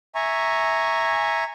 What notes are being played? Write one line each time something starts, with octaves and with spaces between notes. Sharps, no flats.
E5 G#5 A#5 C#6